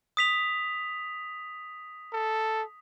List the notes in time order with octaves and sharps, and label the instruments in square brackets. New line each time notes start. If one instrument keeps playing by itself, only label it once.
[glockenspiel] D#6 B6 F7
[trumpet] A4